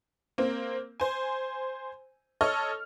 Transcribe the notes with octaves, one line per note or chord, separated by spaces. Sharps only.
A#3 C4
C5 G#5
A4 C#5 D#5 C#6 F6